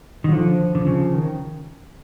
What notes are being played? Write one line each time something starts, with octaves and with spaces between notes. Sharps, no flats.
D#3
F#3
D3 F3
D3
C#3
D#3